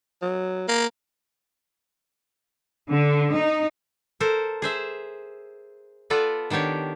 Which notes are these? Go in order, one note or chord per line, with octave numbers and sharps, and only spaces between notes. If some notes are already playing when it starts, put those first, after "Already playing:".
F#3
A#3 F5
D3
D#4
A4 A#4 C5
G#4 C5 E5
B3 F4 A4 B4 D5
D#3 B3 D4 G4 C#5